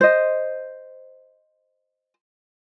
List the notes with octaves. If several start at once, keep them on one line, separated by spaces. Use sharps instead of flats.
C5 D#5